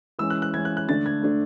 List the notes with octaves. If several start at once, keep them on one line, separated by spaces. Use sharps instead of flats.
E3 G#3 C#4 E6
F#6
F#6
E3 G#3 C#4 G#6
F#6
F#6
D3 A3 D4 A6
G#6
D3 A3 D4